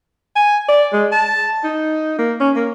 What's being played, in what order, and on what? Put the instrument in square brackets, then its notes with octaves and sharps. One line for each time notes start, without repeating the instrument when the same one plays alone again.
[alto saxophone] G#5
D5
G#3
A5
D#4
A#3
C#4
A#3